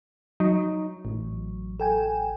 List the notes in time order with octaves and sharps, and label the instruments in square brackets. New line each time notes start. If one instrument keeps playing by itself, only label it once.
[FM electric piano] F#3 [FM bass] D#4
[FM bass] A1
[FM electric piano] A4 G5 G#5